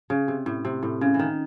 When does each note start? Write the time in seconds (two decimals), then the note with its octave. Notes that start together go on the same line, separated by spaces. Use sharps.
0.10 C#3
0.28 C3
0.46 A2
0.65 C3
0.83 A2
1.01 C#3
1.14 E3
1.19 D#3